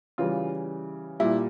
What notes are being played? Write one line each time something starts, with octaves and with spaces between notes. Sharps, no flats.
C#3 E3 G3 F4
A#2 G3 E4